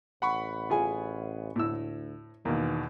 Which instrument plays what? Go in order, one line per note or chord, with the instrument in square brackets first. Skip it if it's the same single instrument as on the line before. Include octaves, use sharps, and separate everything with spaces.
[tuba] A1 [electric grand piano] F#5 B5 C#6
[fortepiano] F4 G#4 G#5
[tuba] D2 [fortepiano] A2 E6
[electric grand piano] E2 B2 [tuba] D#3 [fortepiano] A#3